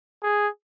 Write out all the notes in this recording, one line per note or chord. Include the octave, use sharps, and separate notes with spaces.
G#4